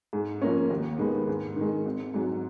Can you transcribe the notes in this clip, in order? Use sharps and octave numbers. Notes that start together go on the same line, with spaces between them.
G#2
F3 A#3 C#4
D#2
D#3 G#3 B3
G#2
D#3
G#3
G#1
G#2 F#3